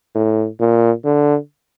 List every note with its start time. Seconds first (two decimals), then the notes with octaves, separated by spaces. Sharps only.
0.15 A2
0.60 A#2
1.05 D3